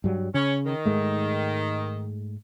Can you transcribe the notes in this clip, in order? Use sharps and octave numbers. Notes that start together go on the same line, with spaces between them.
G2 F#3 G3
C#3 C#4
D#3
G#2 G#3 A3